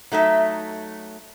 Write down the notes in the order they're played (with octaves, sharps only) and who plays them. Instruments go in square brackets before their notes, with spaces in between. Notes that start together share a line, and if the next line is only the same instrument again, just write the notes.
[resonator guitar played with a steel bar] F#3 A3 D#4 E5